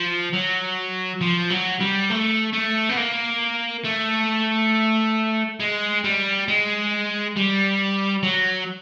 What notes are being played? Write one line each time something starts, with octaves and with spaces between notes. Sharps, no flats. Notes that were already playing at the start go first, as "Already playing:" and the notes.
Already playing: F3
F#3
F3
F#3
G3
A3
A3
B3
A#3
A3
G#3
G3
G#3
G3
F#3